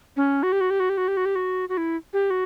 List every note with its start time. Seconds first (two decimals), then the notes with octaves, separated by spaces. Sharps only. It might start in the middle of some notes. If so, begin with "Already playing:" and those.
0.17 C#4
0.43 F#4
0.52 G4
0.61 F#4
0.70 G4
0.80 F#4
0.90 G4
0.98 F#4
1.08 G4
1.17 F#4
1.25 G4
1.36 F#4
1.69 F#4
1.77 E4
2.13 G4
2.30 F#4